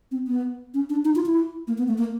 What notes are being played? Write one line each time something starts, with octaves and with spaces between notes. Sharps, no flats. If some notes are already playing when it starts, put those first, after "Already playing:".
C4
B3
C#4
D4
D#4
F4
E4
A#3
B3
A3
A#3